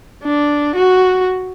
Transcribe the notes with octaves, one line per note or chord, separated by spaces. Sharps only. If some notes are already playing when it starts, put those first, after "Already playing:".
D4
F#4